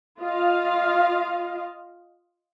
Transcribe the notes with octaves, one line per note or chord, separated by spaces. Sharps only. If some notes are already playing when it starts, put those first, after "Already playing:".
F4 D#5 F5